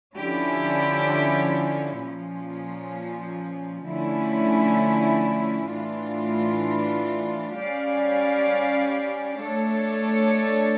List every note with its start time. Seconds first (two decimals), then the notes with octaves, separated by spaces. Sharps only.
0.16 D3 F3 C#4 E4 G4
2.01 A#2 F3 C#4
3.85 D3 F3 A3 C#4 E4
5.70 A2 E3 A3 D4 F4
7.54 G3 C#4 G4 D5 F5
9.40 A3 D4 A4 C#5